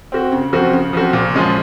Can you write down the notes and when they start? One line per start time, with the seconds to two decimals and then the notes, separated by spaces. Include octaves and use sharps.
0.12 C4 F#4
0.32 C#3
0.53 F3 C4 F#4
0.73 C#3
0.93 F3 C4 F#4
1.13 A#2
1.34 F3 G#3 C#4